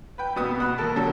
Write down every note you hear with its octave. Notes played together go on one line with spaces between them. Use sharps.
B4 G5
F2 B2 B3 D#6
B2 F#5 B5
D#2 A4 A#4 A5
D3 F#3 G3 A4